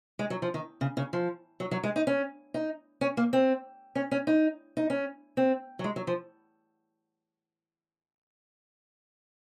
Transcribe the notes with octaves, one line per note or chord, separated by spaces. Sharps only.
G#3
F#3
F3
D#3
C#3
C#3
F3
F#3
F#3
G#3
D#4
C#4
D#4
C#4
A#3
C4
C#4
C#4
D#4
D#4
C#4
C4
F#3
G#3
F#3
F3